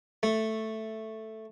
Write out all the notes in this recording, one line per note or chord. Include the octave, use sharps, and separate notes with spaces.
A3